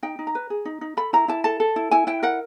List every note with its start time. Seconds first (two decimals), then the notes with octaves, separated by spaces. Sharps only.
0.03 D#4 G5
0.19 D#4
0.27 A#5
0.35 B4
0.50 G#4
0.65 D#4
0.81 D#4
0.97 A4 B5
1.13 E4 A#5
1.28 E4 A5
1.44 A4 A5
1.60 A4
1.76 E4
1.91 E4 G#5
2.07 E4 G5
2.23 A#4 F#5